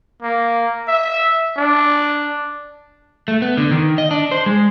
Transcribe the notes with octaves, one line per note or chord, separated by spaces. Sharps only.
A#3
E5
D4
A3
B3
D3
D#3
D#5
D4
C5
G#3